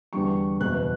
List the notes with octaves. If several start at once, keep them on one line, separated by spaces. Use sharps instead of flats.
E2 D3 G3 C#6
F#1 E2 B2 F#6